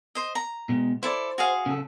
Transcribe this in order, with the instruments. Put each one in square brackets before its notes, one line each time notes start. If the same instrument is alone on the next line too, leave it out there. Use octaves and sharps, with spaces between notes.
[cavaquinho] C5 D#5
A#5
[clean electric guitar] B2 G#3
[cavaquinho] E4 A4 D5 [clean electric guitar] C5
[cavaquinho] F#4 G#4 F5
[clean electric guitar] C#3 A4